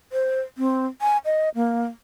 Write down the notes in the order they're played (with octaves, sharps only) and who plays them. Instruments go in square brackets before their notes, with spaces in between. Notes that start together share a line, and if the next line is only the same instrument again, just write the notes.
[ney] C5
C4
G#5
D#5
A#3